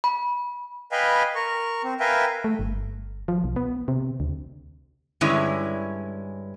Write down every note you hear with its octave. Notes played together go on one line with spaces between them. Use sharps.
B5
B4 D#5 F5 G5 G#5 B5
A#4 C#6
C4
A#4 B4 E5 F5 G5 G#5
A3
G1
F3
B1
B3
C3
D2
G2 D3 G#3 C#4 E4